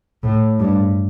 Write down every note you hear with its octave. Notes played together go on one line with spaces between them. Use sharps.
A2
G2